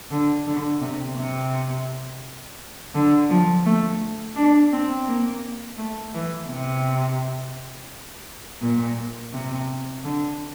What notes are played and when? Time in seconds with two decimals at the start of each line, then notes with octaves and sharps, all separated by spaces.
0.11 D3
0.46 D3
0.81 C3
1.17 C3
2.95 D3
3.30 F3
3.65 A3
4.36 D4
4.72 C4
5.08 A#3
5.78 A3
6.14 E3
6.49 C3
8.62 A#2
9.33 C3
10.04 D3